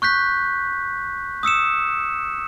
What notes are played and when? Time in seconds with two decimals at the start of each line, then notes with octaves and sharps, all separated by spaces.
0.02 C#6 F#6 G6 B6
1.43 D#6 E6 C#7 E7